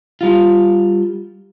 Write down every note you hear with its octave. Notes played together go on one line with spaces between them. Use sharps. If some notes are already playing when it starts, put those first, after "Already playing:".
G3 F4